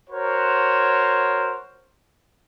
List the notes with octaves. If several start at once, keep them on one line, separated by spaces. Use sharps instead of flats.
F#4 A#4 C5 C#5